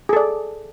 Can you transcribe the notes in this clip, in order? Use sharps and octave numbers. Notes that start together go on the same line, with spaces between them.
G#4 A4 D5